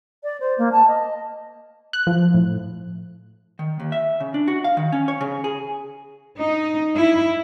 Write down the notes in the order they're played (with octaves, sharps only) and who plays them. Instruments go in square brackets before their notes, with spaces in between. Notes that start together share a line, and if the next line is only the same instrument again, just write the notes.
[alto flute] D5
C5
A#3
A5
D#5
[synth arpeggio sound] F#6
F3
A2
[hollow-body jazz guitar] D#3
D#2
E5
C#3
D4
F#4
F5
D#3
C#4
C#5
C#3
G#4
[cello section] D#4
E4